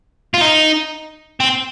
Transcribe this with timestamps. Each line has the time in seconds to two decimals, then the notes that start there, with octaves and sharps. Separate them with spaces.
0.34 F4
0.41 D#4
1.40 C4